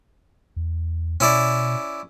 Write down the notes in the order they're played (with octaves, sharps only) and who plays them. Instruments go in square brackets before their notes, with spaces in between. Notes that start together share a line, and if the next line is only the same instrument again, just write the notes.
[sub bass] E2
[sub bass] B2 [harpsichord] C#4 E4 D5